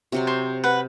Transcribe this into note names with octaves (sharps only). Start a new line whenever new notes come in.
C3 F#3 C6
C5 C#5
B4 F#5